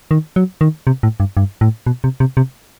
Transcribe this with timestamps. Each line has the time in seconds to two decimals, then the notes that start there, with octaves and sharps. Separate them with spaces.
0.11 D#3
0.36 F#3
0.61 D#3
0.87 C3
1.03 A2
1.20 G2
1.37 G2
1.61 A2
1.87 B2
2.04 C3
2.20 C3
2.37 C3